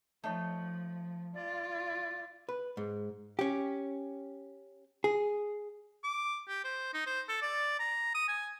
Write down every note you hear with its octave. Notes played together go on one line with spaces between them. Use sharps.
F3 A3 D#4 C#5
F4 D5
B4
G#2
C#4 G4
G#4
D6
G4
C5
D#4
C5
A4
D5
A#5
D#6
G#5